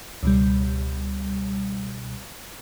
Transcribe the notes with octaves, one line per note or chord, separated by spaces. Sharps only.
C#2 B2 G3